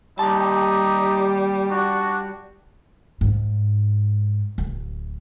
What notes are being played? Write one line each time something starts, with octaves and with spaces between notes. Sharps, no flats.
D#2 G3 D#4 G4 A5
D4 F#4
G#2
D1